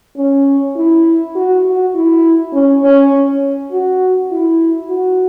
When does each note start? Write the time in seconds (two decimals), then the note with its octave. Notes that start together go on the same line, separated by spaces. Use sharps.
0.17 C#4
0.77 E4
1.35 F#4
1.65 F#4
1.95 E4
2.53 C#4
2.84 C#4
3.13 C#4
3.72 F#4
4.32 E4
4.90 F#4